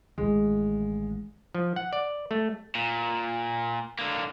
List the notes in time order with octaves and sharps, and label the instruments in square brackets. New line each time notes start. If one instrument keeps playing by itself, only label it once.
[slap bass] A1 D#3 E3 [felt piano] G#3
[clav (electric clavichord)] F3
F#5
D5
A3
[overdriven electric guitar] A#2
D3 A#3